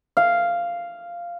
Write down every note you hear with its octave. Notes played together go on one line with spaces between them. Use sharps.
F5